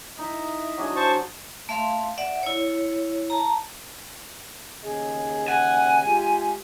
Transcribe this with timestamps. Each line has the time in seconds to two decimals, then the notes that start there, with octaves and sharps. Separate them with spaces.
0.19 D#4 E4 D#5 E5
0.78 F#3 D4 G#4
0.96 C5 A5 C#6
1.69 A3 E5 F5 C6
2.18 D5 E5 F#5
2.43 E4 C#5
3.30 A5 A#5
4.83 D#2 C#3 G#4 D#5
5.48 F#5 G#5
6.04 G#3 F4 G4 G#4